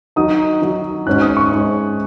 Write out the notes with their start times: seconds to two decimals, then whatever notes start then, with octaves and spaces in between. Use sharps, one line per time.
0.16 D#3 F#3 D#4 D#6
0.62 D#3 F#3 D#4
1.06 G#2 G#3 C#4 F#6
1.22 D#6
1.37 C#6
1.52 G#2 G#3 C#4